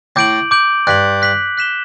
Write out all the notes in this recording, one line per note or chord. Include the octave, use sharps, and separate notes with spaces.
A2 D6 G6 D7 F#7
D6 G6 D7 F#7
G2 F#6 B6 F#7
F#6 B6 F#7
F#6 B6 E7 G7